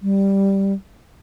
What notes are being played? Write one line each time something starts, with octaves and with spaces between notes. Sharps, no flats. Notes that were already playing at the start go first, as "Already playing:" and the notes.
G3